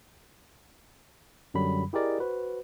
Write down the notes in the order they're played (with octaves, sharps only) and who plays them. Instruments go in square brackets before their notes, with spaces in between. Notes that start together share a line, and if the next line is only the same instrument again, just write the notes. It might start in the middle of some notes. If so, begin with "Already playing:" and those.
[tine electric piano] F#2 D3 F#3 G3 B5
E4 G4 G#4 A#4 D5 D#5
F#4 B4 C5